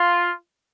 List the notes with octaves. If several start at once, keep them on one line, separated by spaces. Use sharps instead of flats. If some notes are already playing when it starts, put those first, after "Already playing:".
Already playing: F4